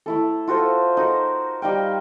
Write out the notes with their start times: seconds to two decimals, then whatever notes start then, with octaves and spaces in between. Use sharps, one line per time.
0.06 A3 E4 A4
0.48 F4 F#4 A4 C5
0.97 D#4 F#4 A#4
1.62 G3 D#4 F5 G5